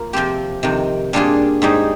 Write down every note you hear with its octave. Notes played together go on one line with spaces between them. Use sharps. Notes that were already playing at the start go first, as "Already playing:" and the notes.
Already playing: A#3 F4
C3 F3 C4 G4
F2 C3 D#3
A#2 G3 D4 F4 G#4
G#2 G3 C4 D#4 G#4